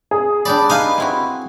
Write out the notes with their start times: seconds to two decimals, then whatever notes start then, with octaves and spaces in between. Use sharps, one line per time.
0.11 G#4
0.45 D4 G4 D5 B5
0.70 D#4 B4 F5 G#5
0.98 C4 E4 F#4